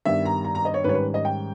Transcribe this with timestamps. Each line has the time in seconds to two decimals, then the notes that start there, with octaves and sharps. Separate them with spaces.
0.05 G2 D#3 G3 B3 E5
0.25 A#5
0.44 A#5
0.55 A#5
0.65 D#5
0.74 C#5
0.84 G#2 D#3 G3 C#4 B4 C#5
0.94 B4
1.14 D#5
1.25 G5